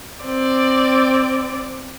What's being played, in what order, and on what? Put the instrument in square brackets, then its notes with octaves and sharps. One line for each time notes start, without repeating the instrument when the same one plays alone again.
[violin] C4 D5